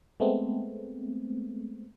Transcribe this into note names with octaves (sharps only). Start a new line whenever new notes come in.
G#3 A3 B3 C4